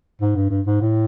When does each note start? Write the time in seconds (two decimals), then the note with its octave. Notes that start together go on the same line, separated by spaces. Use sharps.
0.21 G#2
0.35 G2
0.50 G2
0.66 G#2
0.81 A2